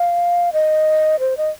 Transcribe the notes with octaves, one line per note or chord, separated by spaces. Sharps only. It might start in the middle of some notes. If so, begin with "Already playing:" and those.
Already playing: F5
D#5
C5
D#5